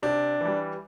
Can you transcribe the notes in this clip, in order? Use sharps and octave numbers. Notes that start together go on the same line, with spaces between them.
C3 D4
E3 G3